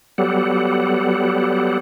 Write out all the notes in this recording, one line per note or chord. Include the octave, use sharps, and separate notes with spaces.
F#3 G3 B3 G4 A4 F#5